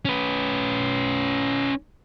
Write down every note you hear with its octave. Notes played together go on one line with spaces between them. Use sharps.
C#4 B4